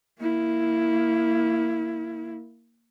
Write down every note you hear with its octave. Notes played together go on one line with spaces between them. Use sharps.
A#3 E4